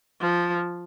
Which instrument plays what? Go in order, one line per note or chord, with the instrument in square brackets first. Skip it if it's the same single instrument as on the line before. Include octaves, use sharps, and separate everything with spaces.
[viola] F3